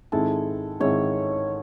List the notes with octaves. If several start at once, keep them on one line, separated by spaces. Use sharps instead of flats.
G#2 D#3 G#3 C4 E4 A4
G#2 D#3 G#3 C4 E4 C#5